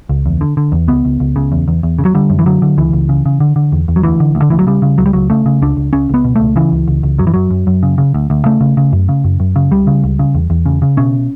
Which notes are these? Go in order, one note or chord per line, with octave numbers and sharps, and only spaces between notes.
C#2
E2
D3
D3
E2
C#2 B3
C#2
C#2
C#3
E2
E2
E2
C#3
F#3
D3 G3
F#2
E3
D3 F#3
D3
C#2 E3
C#2
C#3
C#3
D3
D3
E2
E2
F#3
D2 E3
D3
D2
D3
D2 E3
F#3
C#3 G3
C#3
C#2 F#3
G3
C#2 F#3
C#3 A3
C#3
C#2 D4
C#2
C#2 C#4
C#2 B3
B2
C#2 A3
C#3 E3
C#2
C#2
C#2
F#2 F#3
E3
F#2 F#3
F#2
F#2
C#3
C#3
D2
D2
C#3 A3
C#3
C#3
F#2
C#3
F#2
F#2
C#3
C#2 G3
C#3
C#2
C#3
E2
E2
C#3
C#3
B2 C#4